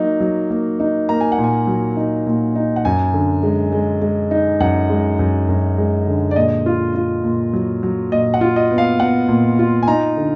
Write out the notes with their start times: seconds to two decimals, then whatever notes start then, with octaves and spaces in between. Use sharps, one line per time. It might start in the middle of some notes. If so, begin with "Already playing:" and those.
Already playing: F#3 A#3 D#4
0.20 F#3
0.50 A#3
0.80 D#4
1.09 A#3 A#5
1.21 G#5
1.32 F#5
1.38 A#2
1.44 G#5
1.67 F#3
1.97 D#4
2.27 A#2
2.55 D#4
2.76 F#5
2.85 F#2 G#5
3.14 D3
3.43 G#3
3.72 G#3
4.02 G#3
4.31 D#4
4.60 F#2 F#5
4.90 G#3
5.19 F#2
5.48 F#2
5.78 G#3
6.07 D3
6.31 D5
6.36 A#2 D#5
6.66 F4
6.95 F4
7.24 A#2
7.53 F#3
7.83 F#3
8.12 A#2 D#5
8.34 F#5
8.41 F4
8.56 D#5
8.71 B3
8.78 F5
9.00 B3 F#5
9.29 A#2
9.59 F4
9.83 G#5
9.88 D#4 A#5
10.17 D3